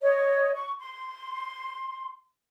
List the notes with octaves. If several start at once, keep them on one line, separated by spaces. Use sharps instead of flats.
C#5 D#5
C#6
C6